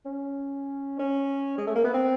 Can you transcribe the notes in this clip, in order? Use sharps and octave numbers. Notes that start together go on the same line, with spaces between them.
C#4
C#4
G#3
A3
A#3
B3
C4